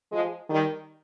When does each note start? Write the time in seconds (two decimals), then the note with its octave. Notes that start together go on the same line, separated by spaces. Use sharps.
0.12 F3 G#3
0.50 D#3 G3